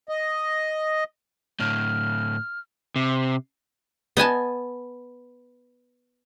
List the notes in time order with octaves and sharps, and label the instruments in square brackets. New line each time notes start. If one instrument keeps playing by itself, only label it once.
[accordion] D#5
[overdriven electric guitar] A2 D3 [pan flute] F6
[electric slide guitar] C3
[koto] B3 D#5 G#5 A5